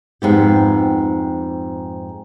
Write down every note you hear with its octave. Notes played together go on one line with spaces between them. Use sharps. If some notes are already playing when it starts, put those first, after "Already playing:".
F2 G#2 B3 G4